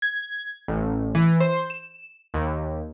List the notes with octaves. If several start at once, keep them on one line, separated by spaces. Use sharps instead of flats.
G#6
A1
E3
C5
E7
D#2